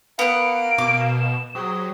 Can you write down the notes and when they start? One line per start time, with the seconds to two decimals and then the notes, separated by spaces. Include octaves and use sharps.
0.19 A#3 B3 F5 F#5 D7
0.78 B2 D6
1.01 E7
1.55 F#3 G4 G#4 C5 D#6